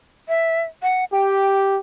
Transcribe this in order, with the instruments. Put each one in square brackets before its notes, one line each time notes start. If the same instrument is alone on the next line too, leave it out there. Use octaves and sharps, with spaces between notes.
[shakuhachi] E5
F#5
[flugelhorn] G4 [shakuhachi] G5